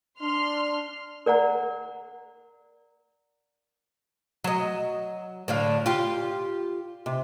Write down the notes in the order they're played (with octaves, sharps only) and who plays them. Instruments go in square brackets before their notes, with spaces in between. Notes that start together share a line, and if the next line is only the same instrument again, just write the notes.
[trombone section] D4 [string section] C6 F6
[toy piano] A#4 D5 F#5 A#5
[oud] F#3 D#5
A2 D3 F5
F4 G4
C3